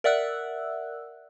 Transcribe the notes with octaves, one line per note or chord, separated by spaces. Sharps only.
A#4 D5 E5 F#5 E6 F#6